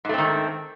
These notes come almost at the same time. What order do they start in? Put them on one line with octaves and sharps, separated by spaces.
G#2 A3 C4 D#3